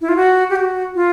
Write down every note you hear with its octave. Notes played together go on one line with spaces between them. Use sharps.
E4
F4
F#4
G4
F#4
F4